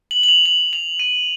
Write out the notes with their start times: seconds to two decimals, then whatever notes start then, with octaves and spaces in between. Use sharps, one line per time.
0.11 F#7
0.23 F#7
0.29 F7
0.46 F#7
0.73 F7
1.00 D#7